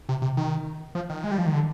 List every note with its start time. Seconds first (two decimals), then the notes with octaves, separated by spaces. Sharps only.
0.09 C3
0.22 C3
0.37 D#3
0.95 F3
1.10 D#3
1.24 G#3
1.31 G3
1.38 F3
1.46 D#3
1.53 D3